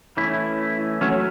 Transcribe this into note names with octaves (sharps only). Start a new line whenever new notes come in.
E3 A3 C#4 E4
F#3 A3 C#4